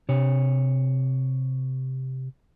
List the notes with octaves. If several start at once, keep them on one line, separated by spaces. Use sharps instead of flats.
C3 C#5